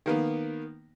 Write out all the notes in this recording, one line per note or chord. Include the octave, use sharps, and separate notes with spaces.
D#3 A#3 B3